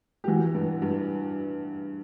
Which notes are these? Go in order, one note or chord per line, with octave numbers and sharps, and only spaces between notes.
G4
E3 F#4
G2
G2